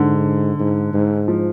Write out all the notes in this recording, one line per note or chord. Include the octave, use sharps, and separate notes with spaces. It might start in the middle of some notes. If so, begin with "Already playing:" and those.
Already playing: G#2 D3
G#2
G#2
F3